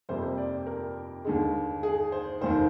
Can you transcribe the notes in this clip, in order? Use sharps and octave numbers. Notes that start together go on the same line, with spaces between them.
F2 C3 G3 A#3 C5
D5
A#4
D#2 D3 G#3
G#4
C5
F1 D#2 D#3 C5